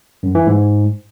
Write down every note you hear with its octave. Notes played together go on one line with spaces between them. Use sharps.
F#2
E3
G#2